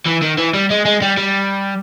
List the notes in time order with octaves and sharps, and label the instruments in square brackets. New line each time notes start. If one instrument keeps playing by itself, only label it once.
[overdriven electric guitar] E3
D#3
E3
G3
G#3
G#3
G3
G3